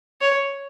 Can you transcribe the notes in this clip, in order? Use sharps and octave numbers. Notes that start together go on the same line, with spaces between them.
C#5